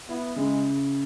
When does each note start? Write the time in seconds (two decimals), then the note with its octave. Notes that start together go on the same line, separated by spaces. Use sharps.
0.08 B3 E4
0.36 C#3 G#3